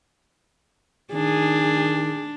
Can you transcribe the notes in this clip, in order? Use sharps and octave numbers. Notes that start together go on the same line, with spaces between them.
D#3 D4 G#4